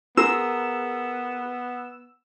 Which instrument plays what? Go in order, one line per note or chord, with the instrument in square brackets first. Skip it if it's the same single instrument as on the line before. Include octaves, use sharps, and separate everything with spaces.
[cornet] B3 [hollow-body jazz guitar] F4 G#4 A#4 [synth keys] E6